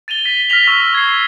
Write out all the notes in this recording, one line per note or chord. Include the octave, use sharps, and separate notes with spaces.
A6 D#7 F7 G7
A6 B6
F6 A#6 B6 F7 F#7
C#6 E6 B6
G#6 C7